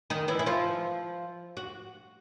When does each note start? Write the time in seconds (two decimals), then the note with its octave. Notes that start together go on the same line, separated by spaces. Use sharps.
0.10 D#3 D#4
0.28 E3 E4
0.39 E4
0.46 F3 F4
1.57 F#4